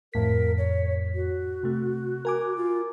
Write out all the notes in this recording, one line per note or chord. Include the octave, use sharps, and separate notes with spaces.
F2 A2 A#4 B6
C#5
F#4
C3 A3
A#4 G#5 D6
F4